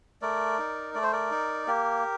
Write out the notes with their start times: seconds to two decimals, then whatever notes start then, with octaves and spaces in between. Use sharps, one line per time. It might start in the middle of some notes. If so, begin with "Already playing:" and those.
0.22 A3 A#4 D5
0.59 D#4
0.94 A3 D5
1.03 C5
1.12 A#4 D5
1.31 D#4
1.67 A#3 G4 A#4